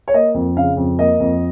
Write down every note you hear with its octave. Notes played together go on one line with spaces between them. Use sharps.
C#5
A#3 D#5
F2
C#3 F5
F2
A#3 D#5
F2